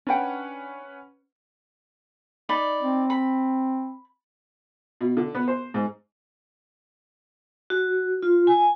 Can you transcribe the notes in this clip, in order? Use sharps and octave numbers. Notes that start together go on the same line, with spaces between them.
C#4 D4 B4 F#5 G5
D#4 D5 B5
C4
B5
B2
D3
B3
C5
G#2
F#4
F4
G#5